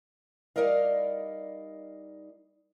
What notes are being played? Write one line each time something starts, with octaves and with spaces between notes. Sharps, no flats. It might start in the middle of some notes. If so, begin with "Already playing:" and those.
G3 D#4 A#4 D5 D#5 F5